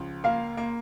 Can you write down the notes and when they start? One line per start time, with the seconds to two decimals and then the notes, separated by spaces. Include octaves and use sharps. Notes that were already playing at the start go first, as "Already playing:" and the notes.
Already playing: C#2 F3
0.24 A#3 F5
0.57 A#3